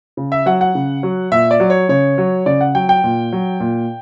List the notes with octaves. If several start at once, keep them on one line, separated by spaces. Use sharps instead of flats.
C#3
E5
F#3 F#5
F#5
C#3
F#3
A#2 E5
D5
F#3
C#5
C#3 C#5
F#3
C#3 D5
F#5
F#3 G5
G5
A#2
F#3
A#2